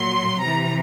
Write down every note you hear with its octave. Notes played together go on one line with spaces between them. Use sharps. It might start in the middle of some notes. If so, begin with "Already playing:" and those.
Already playing: A#2 F#3 C6
C3 E3 A#5